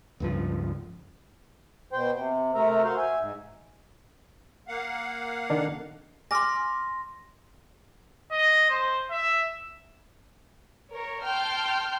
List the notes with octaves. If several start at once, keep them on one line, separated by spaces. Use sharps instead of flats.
C#2 G2 F3
B2 C5 G5
C3
C3 A3 A#4 E5
F#4 C5 F5
E5 G#5
G#2
A#3 F5 F#5
D3 D#3 D4
G#5 C6 D6 F6 A#6
D#5
C5
E5
A#4 C#5
G5 A5 C6 F6 G6